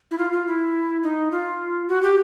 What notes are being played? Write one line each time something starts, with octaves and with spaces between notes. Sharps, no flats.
E4
F4
F4
E4
D#4
F4
F#4
G4